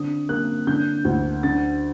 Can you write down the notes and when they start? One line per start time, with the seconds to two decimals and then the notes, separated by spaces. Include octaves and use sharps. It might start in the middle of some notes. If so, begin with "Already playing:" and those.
Already playing: D3 C4 D#6
0.29 A#3 F#6
0.67 D3 G6
1.05 D2
1.43 D3 A6